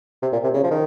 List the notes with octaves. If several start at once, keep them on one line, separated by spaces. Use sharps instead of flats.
C3
A#2
C3
C#3
F3
D#3